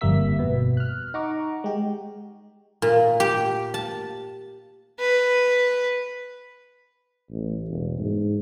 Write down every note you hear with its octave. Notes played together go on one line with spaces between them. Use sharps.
G1 F2 G3 A#3 E5 B6
B2 B3
F6 F#6
D#4 F#5 A#5 C#6 D6
G#3 G4
A#2
G4
A5
B4
A1
E1
G#2